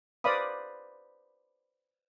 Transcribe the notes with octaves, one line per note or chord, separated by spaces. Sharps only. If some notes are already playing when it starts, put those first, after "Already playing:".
B4 C5 D5 F5 B5 D#6